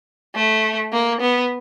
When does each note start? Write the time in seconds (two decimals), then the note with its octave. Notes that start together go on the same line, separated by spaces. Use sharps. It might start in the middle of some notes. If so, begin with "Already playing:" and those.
0.35 A3
0.92 A#3
1.20 B3